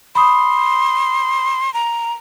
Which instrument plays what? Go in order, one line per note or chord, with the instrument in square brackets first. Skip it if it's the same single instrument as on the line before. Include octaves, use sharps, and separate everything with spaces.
[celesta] B5 D#6 [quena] C6
[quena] A#5